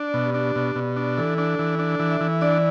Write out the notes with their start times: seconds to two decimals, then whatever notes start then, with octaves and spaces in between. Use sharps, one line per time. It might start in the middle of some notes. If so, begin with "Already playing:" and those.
Already playing: D4 D5
0.14 B2
0.25 G4
0.34 D4
0.40 G4
0.55 B2
0.75 B2
0.96 D4
1.17 E3 A4
1.38 D4
1.59 E3
1.79 D4
1.99 E3
2.10 E5
2.21 E3
2.41 D4 D5